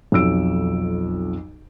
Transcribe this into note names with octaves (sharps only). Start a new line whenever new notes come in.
B1 F2 E6 D7